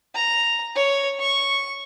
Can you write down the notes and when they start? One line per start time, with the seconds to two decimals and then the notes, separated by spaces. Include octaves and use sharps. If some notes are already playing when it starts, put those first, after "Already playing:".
0.15 A#5
0.75 C#5
1.20 C#6